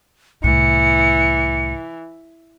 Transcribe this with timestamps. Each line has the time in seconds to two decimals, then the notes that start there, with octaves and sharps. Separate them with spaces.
0.44 C2 A2 E3 C#7